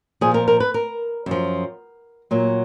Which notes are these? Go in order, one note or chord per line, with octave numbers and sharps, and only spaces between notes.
A#2 F3 G#4
A#4
A#4
B4
A#4
F#2 F3
A#2 F#3